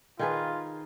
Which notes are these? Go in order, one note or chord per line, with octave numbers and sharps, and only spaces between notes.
D#3 F4 G#4 B4